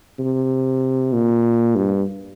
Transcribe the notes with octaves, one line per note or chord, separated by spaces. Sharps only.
C3
A#2
G2